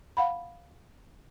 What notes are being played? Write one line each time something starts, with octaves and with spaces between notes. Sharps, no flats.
F5 F#5 B5